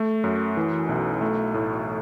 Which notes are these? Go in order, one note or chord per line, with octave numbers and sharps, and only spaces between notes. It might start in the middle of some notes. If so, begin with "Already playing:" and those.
Already playing: A3
F#2
E3
B1
A3
A2